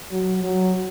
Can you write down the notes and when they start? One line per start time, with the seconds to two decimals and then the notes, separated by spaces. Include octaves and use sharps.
0.12 F#3
0.43 F#3